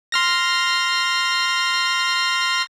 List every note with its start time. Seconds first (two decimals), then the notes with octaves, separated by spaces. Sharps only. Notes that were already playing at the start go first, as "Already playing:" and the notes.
0.12 C6 F6 A#6